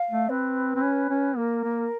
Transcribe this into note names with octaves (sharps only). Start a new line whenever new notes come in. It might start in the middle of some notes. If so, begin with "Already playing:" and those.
Already playing: F5
A3
C4 B4
C4
C#4
C#4
A#3 A#4
A#3